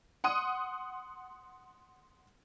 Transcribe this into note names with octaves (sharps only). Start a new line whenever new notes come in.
F#5 C6 D#6 D#7